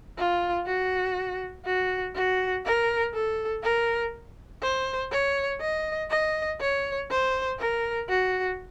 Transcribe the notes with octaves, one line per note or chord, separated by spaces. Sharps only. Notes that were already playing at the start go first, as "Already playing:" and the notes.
F4
F#4
F#4
F#4
A#4
A4
A#4
C5
C#5
D#5
D#5
C#5
C5
A#4
F#4